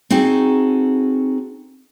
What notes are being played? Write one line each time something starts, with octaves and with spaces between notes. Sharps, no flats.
C4 D#4 F#4 G#4 A4